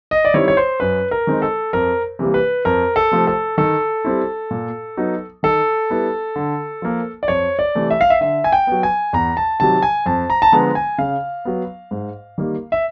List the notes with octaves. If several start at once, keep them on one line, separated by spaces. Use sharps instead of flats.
D#5
D5
D#3 G3 C4 E4 C#5
C#5
C5
F#2 B4
A#4
D#3 G#3 C4 D#4
A4
F2 A#4
C3 E3 G3 A#3
B4
F2 A#4
A4
C3 F3 A3
A4
D#3 A4
G3 C4 E4
A#2
F#3 B3 D#4
D#3 A4
G3 B3 E4
D3
F3 A#3
D5
F2 C#5
D5
C3 E3 A3
E5
F5
E5
D3 E5
G#5
G5
F#3 B3
G#5
E2 A#5
A5
C3 D#3 F#3 A5
G#5
F2 A5
A#5
A5
D3 F3 G#3 B3 A#5
G#5
C#3 F5
F#3 B3
G#2
D#3 G3 A#3
E5